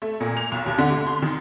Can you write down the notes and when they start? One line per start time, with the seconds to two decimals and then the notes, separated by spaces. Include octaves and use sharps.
0.02 A3
0.20 A#2
0.37 F7
0.52 B1
0.66 D#2
0.78 D3
0.90 A3
1.07 C6
1.22 D#3